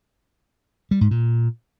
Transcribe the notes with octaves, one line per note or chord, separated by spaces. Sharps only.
G3
G#2
A#2